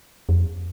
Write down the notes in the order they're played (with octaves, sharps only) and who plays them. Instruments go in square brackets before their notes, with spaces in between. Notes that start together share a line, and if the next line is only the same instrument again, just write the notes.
[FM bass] F2